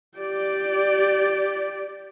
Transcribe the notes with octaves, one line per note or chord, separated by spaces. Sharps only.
G4 D5